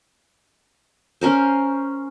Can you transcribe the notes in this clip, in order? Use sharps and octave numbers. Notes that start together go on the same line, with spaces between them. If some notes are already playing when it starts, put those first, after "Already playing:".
C#4 A#4 C5